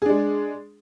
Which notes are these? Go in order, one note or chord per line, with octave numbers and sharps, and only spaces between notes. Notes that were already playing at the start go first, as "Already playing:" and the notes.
G#3 D4 G#4